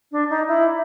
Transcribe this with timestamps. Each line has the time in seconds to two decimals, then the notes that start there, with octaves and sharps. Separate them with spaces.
0.12 D4
0.30 D#4
0.48 E4